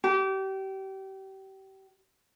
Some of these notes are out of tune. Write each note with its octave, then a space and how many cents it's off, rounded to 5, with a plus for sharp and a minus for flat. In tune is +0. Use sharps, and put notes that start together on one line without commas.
G4 -30